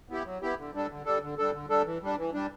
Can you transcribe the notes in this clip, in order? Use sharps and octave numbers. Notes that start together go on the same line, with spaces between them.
B3 E4 G4
F#3
B3 E4 G4
D3
G3 D4 A4
D3
G3 D4 A4
D3
G3 D4 A4
D3
G3 D4 A4
E3
G3 D4
E3
G3 D4